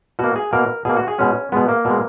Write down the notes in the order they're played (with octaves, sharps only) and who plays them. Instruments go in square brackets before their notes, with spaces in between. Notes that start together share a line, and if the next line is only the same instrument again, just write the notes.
[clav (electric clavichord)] B2 A#3 F#4
G#4
B2 A#3 A#4
B2 A#3 G#4
F#4
G#4
B2 G#3 C#4
B2 G#3 B3
A#3
B2 G#3